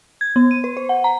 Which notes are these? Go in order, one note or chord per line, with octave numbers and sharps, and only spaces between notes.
G#6
B3
D#7
B4
C5
F#5
A#5